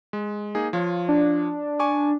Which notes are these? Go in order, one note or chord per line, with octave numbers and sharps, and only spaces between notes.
G#3
A#3 D#4 G#4
F3 F4 C#5
D4
G#5 C#6 D6